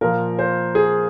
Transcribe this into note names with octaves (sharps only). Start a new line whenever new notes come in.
A#2 F3 A#4
C5
G#4